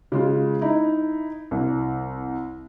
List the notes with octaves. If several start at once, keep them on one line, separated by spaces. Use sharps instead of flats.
C#3 G#3 F4
D#4 E4
C2